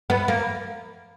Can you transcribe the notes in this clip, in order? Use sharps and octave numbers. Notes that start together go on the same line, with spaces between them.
B3
A#3